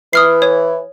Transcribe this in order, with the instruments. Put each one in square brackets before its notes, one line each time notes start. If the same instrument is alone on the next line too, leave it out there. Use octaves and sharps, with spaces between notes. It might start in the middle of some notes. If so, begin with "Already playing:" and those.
[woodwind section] E3 [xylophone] D#6 F6 C7
[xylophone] C#5